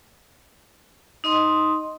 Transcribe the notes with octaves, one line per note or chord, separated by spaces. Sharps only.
D#4 D#5 C6 D#6